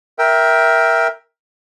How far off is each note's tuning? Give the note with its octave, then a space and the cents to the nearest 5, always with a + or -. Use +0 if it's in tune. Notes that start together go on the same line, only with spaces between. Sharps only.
A#4 +15 E5 +0 G5 +0